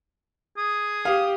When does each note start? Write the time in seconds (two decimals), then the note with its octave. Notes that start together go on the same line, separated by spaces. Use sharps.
0.58 G#4 D#6
1.05 G4 F5